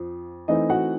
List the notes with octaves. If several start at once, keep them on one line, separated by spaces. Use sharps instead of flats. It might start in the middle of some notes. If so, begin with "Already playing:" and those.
Already playing: F2 F3
E3 A3 C4 D#4 D#5
F#4 F#5